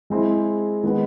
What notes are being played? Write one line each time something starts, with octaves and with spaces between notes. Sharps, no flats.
G#3 C4 E4 G#4 C5
D#3 G#3 B3